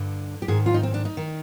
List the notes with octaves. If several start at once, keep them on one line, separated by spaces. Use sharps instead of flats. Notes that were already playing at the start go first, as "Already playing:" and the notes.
Already playing: G2 D3
G4
G#2 D#3 G#4
F4
D#4
C4
D4
D#4
D#3